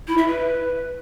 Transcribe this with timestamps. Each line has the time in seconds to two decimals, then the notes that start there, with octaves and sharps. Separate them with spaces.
0.08 E4
0.18 E5
0.28 B4